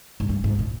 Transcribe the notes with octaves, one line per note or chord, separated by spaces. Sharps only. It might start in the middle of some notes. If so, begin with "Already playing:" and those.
G#2
G2
G#2
A#2